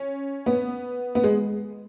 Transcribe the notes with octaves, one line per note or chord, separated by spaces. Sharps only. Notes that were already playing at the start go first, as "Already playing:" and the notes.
Already playing: C#4
B3
B3
G#3